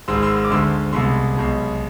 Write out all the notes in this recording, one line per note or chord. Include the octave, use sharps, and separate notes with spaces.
G#1 G#2 G#3 C6 E6
C6 E6
E6
D6
D2 D3 G#3 C6 E6
C2 B2 G#3 C6 E6
B1 B2 G#3